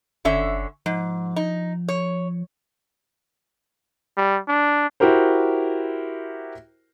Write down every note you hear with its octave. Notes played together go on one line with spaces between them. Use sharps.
F#1 D3 C#4 E5
G#2 F3
D#4
C#5
G3
D4
E4 F#4 G4 A#4 C5